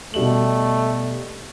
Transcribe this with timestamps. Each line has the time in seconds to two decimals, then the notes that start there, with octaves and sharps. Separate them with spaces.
0.14 B2 G3 A3 F#7